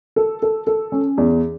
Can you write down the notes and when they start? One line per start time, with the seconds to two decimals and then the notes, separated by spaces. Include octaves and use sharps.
0.16 A4
0.42 A4
0.67 A4
0.92 C#4
1.18 E2